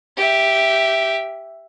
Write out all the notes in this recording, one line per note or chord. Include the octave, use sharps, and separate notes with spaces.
G4 E5